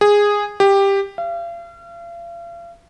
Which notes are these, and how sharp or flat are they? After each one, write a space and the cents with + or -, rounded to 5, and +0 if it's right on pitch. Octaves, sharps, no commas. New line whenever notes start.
G#4 -10
G4 +10
F5 -40